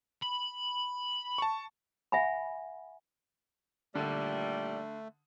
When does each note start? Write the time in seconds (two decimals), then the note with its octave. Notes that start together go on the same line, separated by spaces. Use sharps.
0.23 B5
1.38 A5 C#6
2.12 E5 F#5 G#5 B5
3.95 A#2 D3 D#3 G3 A3